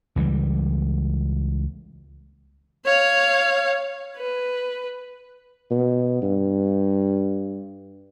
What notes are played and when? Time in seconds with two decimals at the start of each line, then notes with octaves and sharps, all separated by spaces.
0.16 C#2 E3 F#3 G3
2.86 C#5 F5
4.17 B4
5.71 B2
6.22 G2